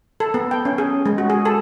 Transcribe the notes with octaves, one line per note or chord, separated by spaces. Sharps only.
A4
B3
G5
C#4
G#4
G#3
F#4
G#4
A4